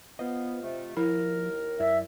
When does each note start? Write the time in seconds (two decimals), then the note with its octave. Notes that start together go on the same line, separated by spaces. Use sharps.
0.19 B3 F4 C5 D#5
0.63 C3 A3
0.97 D#2 F3 E4 A#4
1.80 F#2 E4 D5 E5